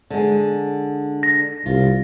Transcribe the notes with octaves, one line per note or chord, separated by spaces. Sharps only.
D3 G#3
A#6
C2 F4